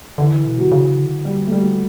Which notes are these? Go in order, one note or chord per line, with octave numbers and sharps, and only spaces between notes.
D3 E3
B2
D3 F#3
C#3
D3
G3
A3
G3